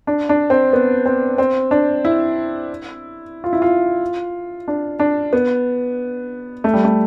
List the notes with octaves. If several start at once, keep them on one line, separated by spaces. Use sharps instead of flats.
D4
D4
C4
B3
C4
C4
D4
E4
F4
E4
F4
D4
D4
B3
A3
G3
A3